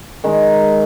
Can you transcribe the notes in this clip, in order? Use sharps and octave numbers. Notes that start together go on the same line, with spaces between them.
D#3 G#3 D#4